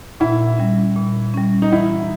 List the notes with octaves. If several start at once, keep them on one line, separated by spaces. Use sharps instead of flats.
A#2 E4
G3 C#4
A#2
G3 C#4
D#4
E3 E4